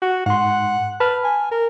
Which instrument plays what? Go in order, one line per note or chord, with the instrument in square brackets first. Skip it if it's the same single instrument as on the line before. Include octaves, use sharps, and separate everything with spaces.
[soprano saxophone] F#4
[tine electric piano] G#2 C6 [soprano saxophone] F#5
[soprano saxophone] B4 [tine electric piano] A5 F6
[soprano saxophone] G#5
A#4